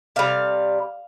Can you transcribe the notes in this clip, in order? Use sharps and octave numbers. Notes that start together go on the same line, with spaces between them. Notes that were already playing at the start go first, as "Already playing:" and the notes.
C3 G3 F5